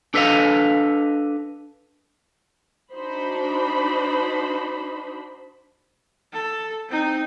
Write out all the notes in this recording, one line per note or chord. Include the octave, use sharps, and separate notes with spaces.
D4 A4 B4 D#5 F5
D4 D#4 F#4 C5 B5
A4
C4 D#4